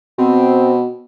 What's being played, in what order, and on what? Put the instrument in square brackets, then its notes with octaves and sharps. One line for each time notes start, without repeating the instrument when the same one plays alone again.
[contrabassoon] B2 [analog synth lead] C4